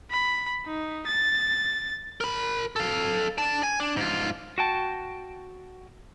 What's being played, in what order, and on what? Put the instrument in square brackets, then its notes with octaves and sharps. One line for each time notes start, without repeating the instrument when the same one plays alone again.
[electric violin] B5
D#4
A6
[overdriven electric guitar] A#4 B5
A4 F5
D5 A5
G#5
D4
G#2 F4
[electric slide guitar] F#4 G5 A5